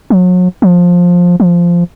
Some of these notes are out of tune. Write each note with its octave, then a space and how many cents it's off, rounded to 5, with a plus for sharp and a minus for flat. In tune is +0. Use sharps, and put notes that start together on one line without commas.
F#3 -35
F3 +15
F3 -10